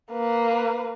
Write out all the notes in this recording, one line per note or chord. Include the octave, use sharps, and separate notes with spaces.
A#3 B4